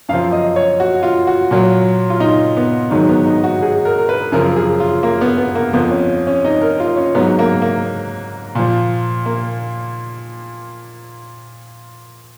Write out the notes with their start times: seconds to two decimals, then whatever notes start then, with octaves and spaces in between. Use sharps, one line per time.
0.09 F#2 F5
0.13 F3
0.32 D#5
0.56 C#5
0.80 F#4
1.03 F4
1.27 F#4
1.51 A#2 F#3
2.10 F4
2.20 D#4
2.57 B3
2.91 G#2 D#3 F#3
3.09 B3
3.26 D#4
3.44 F#4
3.62 G#4
3.85 A#4
3.98 A#4
4.09 B4
4.32 F#2 C#3 F3 A#4
4.56 G#4
4.80 F4
5.03 A#3
5.21 B3
5.38 B3
5.55 A#3
5.74 F2 F3 B3
5.91 C#4
6.27 C#4
6.45 D#4
6.62 A#4
6.80 F4
6.96 C#4
7.15 G#2 F#3 B3
7.39 A#3
7.62 A#3
8.55 A#2 F3
9.26 A#3